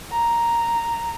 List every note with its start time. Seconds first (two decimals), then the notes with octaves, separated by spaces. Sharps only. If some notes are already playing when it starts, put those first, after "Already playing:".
0.12 A#5